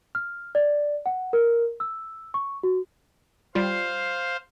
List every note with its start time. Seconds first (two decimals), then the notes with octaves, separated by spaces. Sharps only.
0.15 F6
0.55 D5
1.06 F#5
1.33 A#4
1.80 E6
2.34 C#6
2.63 F#4
3.55 G3 F4 C5 F5